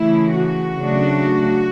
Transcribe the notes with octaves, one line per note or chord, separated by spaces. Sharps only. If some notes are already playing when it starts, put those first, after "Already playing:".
Already playing: C#3 E3 A3 E4
F#4
C#3 F#3 A3 D4